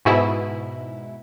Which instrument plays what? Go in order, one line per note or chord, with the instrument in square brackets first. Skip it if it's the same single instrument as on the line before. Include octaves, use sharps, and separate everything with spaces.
[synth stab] G#2 B2 E4